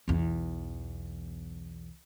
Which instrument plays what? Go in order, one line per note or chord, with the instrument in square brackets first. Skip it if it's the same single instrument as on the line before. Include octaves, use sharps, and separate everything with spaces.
[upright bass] B1 E2